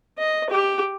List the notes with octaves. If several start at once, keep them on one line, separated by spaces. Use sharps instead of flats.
D#5
G4